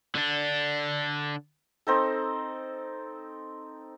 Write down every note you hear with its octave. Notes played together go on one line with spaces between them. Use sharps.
D3 D4
C4 D#4 A4